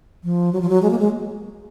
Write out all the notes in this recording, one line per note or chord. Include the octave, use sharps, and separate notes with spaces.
F3
F#3
F3
F#3
G#3
A#3
G#3